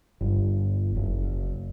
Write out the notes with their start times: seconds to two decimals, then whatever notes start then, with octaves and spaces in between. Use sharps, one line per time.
0.21 G1
0.96 F#1